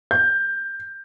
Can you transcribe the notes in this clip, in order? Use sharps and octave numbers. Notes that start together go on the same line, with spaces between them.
G6